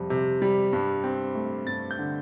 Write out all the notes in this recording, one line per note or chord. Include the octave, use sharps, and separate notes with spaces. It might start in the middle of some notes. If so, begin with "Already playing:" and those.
Already playing: F2 C3 G3
C3
G3
G2
C4
A3
G2 A6
G6
D3